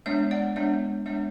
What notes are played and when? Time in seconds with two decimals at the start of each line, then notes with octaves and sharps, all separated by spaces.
0.06 G#3 B3 D4 C#5 E5
0.31 D5 F#5
0.56 G#3 B3 D4 C#5 E5
1.06 G#3 B3 D4 C#5 E5